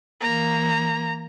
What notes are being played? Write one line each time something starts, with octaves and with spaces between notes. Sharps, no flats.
E3 A#3 A#5